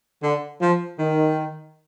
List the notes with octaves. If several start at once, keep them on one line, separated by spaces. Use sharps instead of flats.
D3
F3
D#3